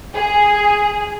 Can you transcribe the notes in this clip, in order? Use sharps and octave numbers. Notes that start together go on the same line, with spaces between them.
G#4